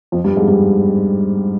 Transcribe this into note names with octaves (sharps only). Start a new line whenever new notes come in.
F2 F3
G2 G3
G#2 G#3
G2 G3